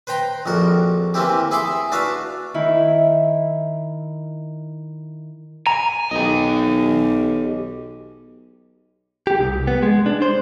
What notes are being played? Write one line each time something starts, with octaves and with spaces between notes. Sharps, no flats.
B4 C5 G5 A#5 C6
A#1 F2 F#4 A#4
E3 A#3 C4 E4 G4
E4 G#4 E5 B5 C6 D6
D4 F#4 B4 E5 F5
D#3 E4
G#5 A#5
B1 G4 D#5
G4
C2
B3
G#3
D4
C5